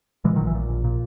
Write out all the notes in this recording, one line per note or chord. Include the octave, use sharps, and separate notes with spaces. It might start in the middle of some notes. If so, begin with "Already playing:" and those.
A#2 E3 G#3
D#3 F#3
A#1
E3
A#2
A#1
A#2